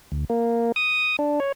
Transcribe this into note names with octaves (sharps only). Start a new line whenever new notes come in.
D2
A#3
D#6
D4
C#5